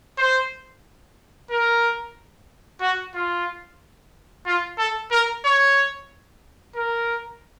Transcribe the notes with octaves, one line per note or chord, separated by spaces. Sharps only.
C5
A#4
F#4
F4
F4
A4
A#4
C#5
A#4